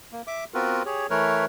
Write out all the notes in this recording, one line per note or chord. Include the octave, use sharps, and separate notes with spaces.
A#3
E5 D6
B3 C4 F4 F#4 A#4 B4
G4 G#4 C#5
E3 A3 A#4 B4 C#5